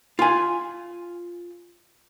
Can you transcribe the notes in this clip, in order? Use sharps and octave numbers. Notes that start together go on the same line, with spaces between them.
F4 G#5